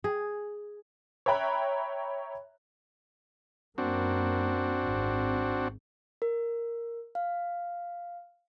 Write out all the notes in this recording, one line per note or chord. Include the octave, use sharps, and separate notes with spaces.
G#4
C#5 E5 G5 A#5 B5 F#6
F#2 A#3 C4 D4 F#4
G#1
A#4
F5